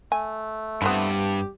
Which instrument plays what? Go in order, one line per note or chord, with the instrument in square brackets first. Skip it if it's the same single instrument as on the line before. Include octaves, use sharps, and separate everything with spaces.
[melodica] A3 [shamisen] G#5
[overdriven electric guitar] G2 [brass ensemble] G3 G4 [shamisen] B3 C4 E4